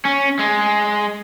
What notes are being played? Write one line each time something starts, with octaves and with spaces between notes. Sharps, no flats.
C#4
G#3